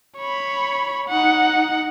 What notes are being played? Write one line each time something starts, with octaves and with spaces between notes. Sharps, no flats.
C#5 B5
D#4 F#5